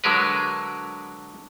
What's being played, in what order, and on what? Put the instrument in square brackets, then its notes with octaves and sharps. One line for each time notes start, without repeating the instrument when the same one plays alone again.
[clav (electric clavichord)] D3 F#3 G#3 A#4 B4